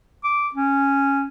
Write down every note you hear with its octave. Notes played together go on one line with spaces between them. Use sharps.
D6
C#4